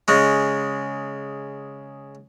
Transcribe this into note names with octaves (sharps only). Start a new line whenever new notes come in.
C#3 G#3